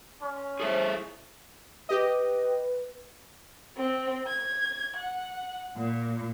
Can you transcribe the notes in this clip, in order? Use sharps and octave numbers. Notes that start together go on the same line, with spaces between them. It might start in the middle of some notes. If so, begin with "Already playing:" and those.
C#4 C6
E4 G#4 A4 C5 E5
G4 B4 D#5
C4
G#6
F#5
A#2